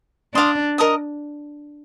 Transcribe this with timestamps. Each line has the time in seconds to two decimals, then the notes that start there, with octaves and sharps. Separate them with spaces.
0.34 D4 D5 F5 C6 D#6
0.78 A#4 D#5 A#5 D#6